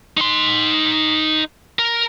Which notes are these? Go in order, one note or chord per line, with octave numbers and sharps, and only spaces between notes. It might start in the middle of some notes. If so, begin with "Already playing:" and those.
D#4 C6
A#4